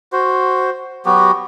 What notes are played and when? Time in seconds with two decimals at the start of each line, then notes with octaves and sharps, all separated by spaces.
0.12 F#4 C5
1.06 F#3 B3 F#4 G4